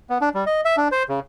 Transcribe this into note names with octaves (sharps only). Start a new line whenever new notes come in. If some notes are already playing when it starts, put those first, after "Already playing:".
B3
D4
G3
D#5
E5
D4
C5
C#3